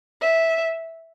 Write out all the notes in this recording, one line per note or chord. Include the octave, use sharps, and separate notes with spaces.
E5